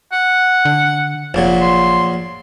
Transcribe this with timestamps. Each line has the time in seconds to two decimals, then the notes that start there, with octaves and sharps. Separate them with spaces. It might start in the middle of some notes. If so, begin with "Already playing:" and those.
0.13 F#5
0.65 D3
1.34 F1 A#1 A#2 F#3
1.62 C6